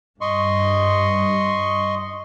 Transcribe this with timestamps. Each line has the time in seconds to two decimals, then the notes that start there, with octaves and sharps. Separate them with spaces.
0.21 G2 D#5 C6 C#6